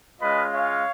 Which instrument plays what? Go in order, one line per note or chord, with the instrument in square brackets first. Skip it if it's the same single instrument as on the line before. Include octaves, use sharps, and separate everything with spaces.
[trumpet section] G#3 C#4 F4 B4 D#5
C#5 F5